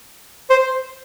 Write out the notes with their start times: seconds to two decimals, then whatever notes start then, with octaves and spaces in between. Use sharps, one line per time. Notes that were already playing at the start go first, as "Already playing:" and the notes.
0.50 C5